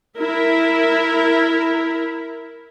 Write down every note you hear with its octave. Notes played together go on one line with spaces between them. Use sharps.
E4 A#4 E5